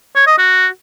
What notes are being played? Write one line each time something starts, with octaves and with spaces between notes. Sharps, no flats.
C#5
D#5
F#4